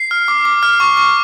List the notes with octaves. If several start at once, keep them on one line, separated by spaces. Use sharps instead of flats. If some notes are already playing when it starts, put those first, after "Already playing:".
Already playing: C7
F6
D6
D6
F6
C#6
C#6